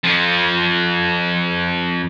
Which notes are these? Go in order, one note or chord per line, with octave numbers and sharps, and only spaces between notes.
F2 F3